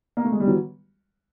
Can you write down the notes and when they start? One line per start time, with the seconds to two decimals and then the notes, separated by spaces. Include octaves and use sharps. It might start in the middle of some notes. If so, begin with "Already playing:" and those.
0.17 A#3
0.25 A3
0.32 G#3
0.40 G3
0.47 E3 F#3